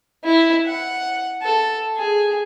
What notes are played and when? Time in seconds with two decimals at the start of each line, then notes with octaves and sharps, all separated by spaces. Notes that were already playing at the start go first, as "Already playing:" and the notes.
0.25 E4
0.66 F#5
1.42 A4
1.97 G#4